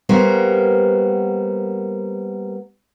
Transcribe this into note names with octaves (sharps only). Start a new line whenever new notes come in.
G3 A#3 B3 F#4 A#4 C5